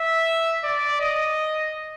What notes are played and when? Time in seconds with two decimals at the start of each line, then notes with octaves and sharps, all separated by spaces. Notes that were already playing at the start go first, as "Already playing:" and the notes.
Already playing: E5
0.64 D5
1.00 D#5